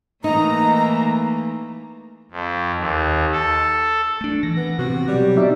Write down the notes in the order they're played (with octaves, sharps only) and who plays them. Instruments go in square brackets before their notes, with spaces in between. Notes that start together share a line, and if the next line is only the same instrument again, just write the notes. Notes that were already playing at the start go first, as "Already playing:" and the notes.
[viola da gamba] E3 A3 A#3 [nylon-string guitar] D#4 [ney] A#5
[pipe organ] F2
D#2
A4
[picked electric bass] A3 D4
[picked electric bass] E3 [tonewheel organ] A#6
[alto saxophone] B3
[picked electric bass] C3 B3 C4 [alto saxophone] F#4
[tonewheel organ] B2 F#3 [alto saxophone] G3
[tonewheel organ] D#4 D5 E5